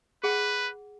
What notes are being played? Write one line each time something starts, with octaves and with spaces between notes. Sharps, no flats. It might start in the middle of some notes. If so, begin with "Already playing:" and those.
G#4 B4 F#5